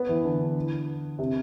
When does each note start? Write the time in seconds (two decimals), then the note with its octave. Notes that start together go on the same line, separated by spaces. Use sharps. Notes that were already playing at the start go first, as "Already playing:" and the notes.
Already playing: B3
0.09 E3
0.25 D3
1.19 C3